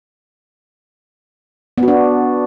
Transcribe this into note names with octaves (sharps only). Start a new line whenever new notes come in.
B3
F#4
D4